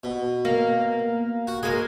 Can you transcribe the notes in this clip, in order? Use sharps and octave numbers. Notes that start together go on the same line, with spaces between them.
B2
A#3
F#4
G#3 A#3 G#5